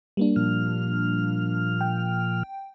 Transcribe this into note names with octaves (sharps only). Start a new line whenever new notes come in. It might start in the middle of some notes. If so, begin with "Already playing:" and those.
G3 A#3 D4
A#2 F3 F6
G5